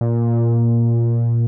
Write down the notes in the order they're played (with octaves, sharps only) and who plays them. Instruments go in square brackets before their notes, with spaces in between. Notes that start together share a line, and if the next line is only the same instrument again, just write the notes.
[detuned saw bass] A#2